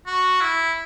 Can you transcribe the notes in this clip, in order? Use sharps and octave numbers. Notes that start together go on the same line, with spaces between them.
F#4
E4